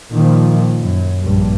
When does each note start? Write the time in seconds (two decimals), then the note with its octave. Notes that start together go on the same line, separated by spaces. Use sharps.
0.11 A#2 D#3 F3
0.82 F#2
1.22 A#1 G2